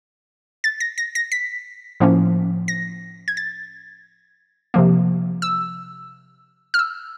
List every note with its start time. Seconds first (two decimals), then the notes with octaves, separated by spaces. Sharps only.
0.64 A6
0.80 A#6
0.98 A#6
1.15 A#6
1.32 B6
2.00 A2 F3 A#3 C#4
2.68 A#6
3.28 G#6
3.37 A6
4.74 C3 F3 A#3
5.42 E6
6.74 F6
6.79 E6